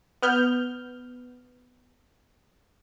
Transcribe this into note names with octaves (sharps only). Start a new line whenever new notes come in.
B3 F6 G6